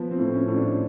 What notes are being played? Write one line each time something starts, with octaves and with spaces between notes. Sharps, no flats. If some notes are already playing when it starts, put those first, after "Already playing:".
Already playing: F3 B3
C4
A2
C#4
A2
D4